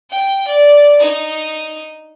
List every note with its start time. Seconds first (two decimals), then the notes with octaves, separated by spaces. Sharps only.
0.10 G5
0.48 D5
1.00 D#4